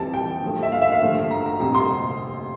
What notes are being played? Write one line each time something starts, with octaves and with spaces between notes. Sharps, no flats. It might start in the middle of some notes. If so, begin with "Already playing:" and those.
Already playing: F2 E3 G3 A5
G5
G2 F3 A3
E5
F5
E5
F5
G2 D3 F3 A3
A#5
A#5
F2 C3 G3 A#5
C6